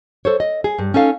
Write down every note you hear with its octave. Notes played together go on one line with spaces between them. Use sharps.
A4 C5 C#5
D#5
G#4
G2
C#4 D#4 A4 F5